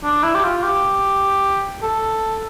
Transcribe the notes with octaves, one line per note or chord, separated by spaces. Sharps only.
D4
E4
G4
F4
G4
A4